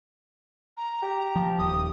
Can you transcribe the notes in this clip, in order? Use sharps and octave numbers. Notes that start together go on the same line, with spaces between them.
A#5
G4
F3
D#1 D#6